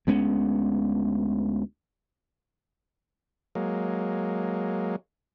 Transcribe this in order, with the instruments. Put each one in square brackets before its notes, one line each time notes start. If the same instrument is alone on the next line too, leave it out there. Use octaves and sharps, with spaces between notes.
[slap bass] D2 G#3 B3 C#4
[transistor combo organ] F#3 G#3 A#3